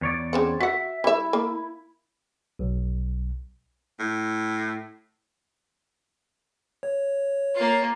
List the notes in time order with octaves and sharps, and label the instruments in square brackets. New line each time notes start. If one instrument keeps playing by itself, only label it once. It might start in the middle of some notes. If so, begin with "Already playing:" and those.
[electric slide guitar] E2 C#5 D5
[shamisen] C#3 C4 F#5
[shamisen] F#4 F#5 [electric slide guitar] E5
[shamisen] G3 E5 [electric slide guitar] E4
[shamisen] A#3
[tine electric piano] B1
[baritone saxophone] A2
[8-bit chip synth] C#5
[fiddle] A#3 F4